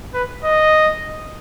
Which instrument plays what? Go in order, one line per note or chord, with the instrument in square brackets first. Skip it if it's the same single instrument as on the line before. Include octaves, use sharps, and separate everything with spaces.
[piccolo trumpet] B4
D#5